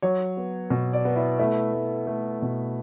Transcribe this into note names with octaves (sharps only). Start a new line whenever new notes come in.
F#3 C#5
B3
B2
D5
B3
E4
A3 E4
A3
A3
B2